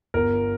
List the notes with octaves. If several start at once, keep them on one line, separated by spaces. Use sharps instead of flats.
G1 A#4